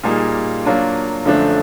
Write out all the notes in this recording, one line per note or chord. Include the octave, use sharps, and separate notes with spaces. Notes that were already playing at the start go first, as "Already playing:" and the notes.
A#2 G3 A#3 D#4 G#4
F#3 A#3 D4 F4
F#2 D3 F3 A3 D4